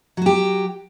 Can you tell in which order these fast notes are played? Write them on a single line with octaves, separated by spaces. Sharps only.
F#3 F#4 G4